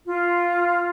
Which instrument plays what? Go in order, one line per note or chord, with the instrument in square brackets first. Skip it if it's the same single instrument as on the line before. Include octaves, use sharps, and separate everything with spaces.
[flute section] F4